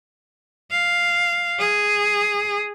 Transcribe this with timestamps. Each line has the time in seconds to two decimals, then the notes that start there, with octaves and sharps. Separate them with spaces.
0.72 F5
1.59 G#4